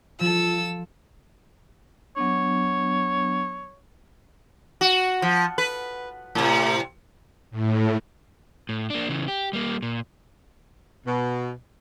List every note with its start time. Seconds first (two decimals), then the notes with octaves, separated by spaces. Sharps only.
0.20 F3 F4 A4 E6
2.16 F#3 B3 D4 C#5
4.81 F#4
5.22 F3
5.58 B4
6.35 A2 C3
7.51 A2
8.69 A2
8.90 A#3 D4
9.09 C#3 E3
9.28 G4
9.53 G3 A#3
9.83 A#2
11.06 B2